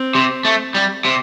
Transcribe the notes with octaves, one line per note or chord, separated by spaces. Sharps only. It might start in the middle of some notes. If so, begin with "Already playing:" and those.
Already playing: C4
C3
A3
G3
C3